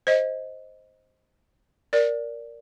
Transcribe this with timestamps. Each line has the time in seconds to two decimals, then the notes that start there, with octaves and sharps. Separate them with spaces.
0.07 C5 D#5
1.93 A#4 D5